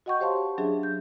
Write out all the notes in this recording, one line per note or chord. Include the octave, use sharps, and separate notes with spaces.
F#4 D#5 F#5 G5 C#6 G6
G4 C5 C#5 F5 A5 C6
F#3 C#4 D4 G#4 E5
G6